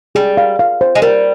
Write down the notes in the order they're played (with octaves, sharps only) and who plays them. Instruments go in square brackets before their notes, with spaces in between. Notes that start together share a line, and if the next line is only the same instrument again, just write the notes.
[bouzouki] G3 [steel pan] G#4
[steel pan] F5
F5
C5
[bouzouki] G#3
[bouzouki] G3 [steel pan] A#4